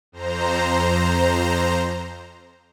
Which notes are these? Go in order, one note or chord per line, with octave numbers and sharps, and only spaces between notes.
F2 C5 A#5